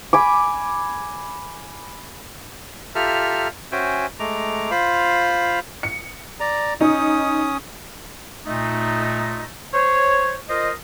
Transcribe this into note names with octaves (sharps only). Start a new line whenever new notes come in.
G#5 B5 D6
F4 G4 A4 E5 A#5 F6
C#4 F#4 C5 E5 G5 G#5
G#3 A3 A#5 D6
F4 C5 F5 B5
C#7
D5 A#5
C#4 D#4 D#6
A#2 A3 D#4
C5 C#5
F4 A#4 C5 D#5